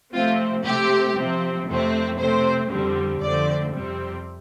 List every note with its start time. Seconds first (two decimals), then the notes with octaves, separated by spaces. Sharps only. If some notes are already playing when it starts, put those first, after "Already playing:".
0.13 C3 F3 A3 C4 F4
0.65 C3 A3 C4 G4
1.16 C3 F3 C4
1.67 F2 C3 A3 C4
2.19 C3 A3 C4 C5
2.70 F2 D3 G3 C4
3.21 F2 D3 F3 A3 C4 D5
3.73 F2 C3 G3 C4